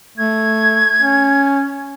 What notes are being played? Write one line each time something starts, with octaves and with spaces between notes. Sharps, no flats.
A3 G#6
C#4